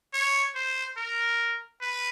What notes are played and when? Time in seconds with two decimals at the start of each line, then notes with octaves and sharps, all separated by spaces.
0.13 C#5
0.55 C5
0.97 A#4
1.81 B4